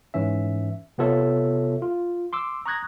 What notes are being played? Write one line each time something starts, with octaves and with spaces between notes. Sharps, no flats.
G#2 E3 C#4 E5
C3 B3 F4 A4 C#5 E5
F4
C6 D6 E6
A#5 C#6 D#6 F#6 G#6 A#6